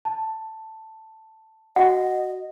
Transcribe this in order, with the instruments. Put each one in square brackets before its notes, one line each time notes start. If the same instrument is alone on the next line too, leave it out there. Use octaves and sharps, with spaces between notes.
[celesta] A5
[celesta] F#4 [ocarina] D#5 [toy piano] F#5